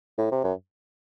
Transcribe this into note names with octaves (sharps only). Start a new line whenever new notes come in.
A2
C3
F#2